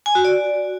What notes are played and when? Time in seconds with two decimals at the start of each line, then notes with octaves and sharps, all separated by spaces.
0.06 G#5
0.15 F#4
0.25 D5